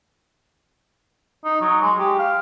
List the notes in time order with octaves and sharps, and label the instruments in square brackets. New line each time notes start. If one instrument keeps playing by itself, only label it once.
[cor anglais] D#4
F#3
G#3
G4
F5